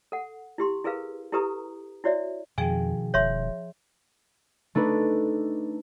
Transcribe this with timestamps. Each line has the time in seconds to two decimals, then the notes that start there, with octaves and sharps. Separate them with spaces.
0.12 A4 F#5
0.58 E4 G4 C6
0.84 E4 G#4 A#4 B4 F5
1.32 E4 G4 A4 B4 A#5 D#6
2.04 E4 F#4 C#5 D5 E5
2.58 F2 B2 D#3 F3 G#4 G5 G#5
3.14 E1 C#5 E5 C6
4.75 A3 D4 D#4 B4